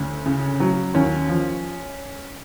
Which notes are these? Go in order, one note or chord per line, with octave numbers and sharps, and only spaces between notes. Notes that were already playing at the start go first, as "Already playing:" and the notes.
Already playing: D2 C#4
C#3
F#3
D#2 C#4
F3